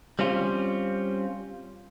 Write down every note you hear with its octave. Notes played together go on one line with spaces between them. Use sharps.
G3 C4 C#4 F4